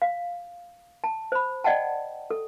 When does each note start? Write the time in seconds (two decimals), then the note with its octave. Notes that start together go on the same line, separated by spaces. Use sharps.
0.02 F5
1.04 A5
1.32 C5 B5
1.64 D5 D#5 F#5 G5 A5
2.31 A4